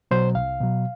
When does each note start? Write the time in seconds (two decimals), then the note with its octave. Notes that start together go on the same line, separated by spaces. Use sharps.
0.11 B2 F#3 C5
0.35 C2 F5
0.60 B2 F#3